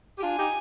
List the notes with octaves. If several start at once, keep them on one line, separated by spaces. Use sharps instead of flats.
G4
D4 F4 G#5
D#4 G4